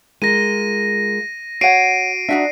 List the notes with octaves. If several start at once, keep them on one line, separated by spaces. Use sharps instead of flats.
G#3 F4 A#4 A#6 D#7
F#4 C#5 F#5 C7 D7 D#7
D4 D#4 F#4 E5